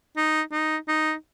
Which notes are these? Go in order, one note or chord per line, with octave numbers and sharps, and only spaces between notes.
D#4
D#4
D#4